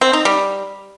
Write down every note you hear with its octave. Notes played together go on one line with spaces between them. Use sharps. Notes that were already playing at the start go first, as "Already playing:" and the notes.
C4
D#4
G3